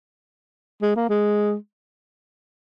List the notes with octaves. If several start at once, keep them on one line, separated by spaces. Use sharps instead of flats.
G#3
A#3
G#3